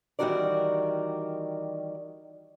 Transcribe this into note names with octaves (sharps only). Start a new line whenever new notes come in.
D#3 E3 G3 F#4 A#4 D5